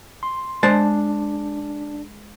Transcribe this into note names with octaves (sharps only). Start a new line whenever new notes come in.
C6
G#3 D4 C5 A5